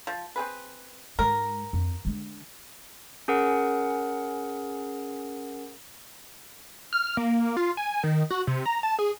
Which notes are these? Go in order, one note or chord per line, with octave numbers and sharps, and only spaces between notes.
F3
C4 G#4 B4
G#2 G#3 A#4
F2
D3 G#3
C#4 G#4 A#4 F#5
F6
A#3
F4
G#5
D#3
F#4
C3
A#5
A5
G#4